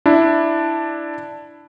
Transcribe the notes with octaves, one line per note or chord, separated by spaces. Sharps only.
D4 E4